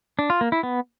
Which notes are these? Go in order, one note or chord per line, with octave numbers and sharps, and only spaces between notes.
D4
F4
A#3
E4
B3